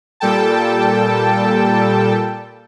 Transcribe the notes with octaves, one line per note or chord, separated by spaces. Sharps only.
A#2 G3 A4 G5 A5